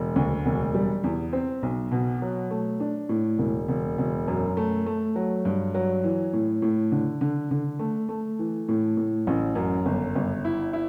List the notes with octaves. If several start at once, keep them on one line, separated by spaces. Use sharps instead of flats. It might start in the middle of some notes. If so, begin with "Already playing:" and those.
Already playing: E1
D2
E1
G3
E2
C4
B1
B2
F#3
A3
D4
A2
E1
E1
E1
F#2
A3
A3
F#3
G2
F#3
E3
A2
A2
D3
D3
D3
A3
A3
E3
A2
A2
A1
F#2
G1
G1
E4
E4